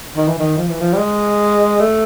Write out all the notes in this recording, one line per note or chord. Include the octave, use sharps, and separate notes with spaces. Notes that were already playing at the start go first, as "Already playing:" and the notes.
D#3
E3
D#3
F3
E3
F3
G3
G#3
A3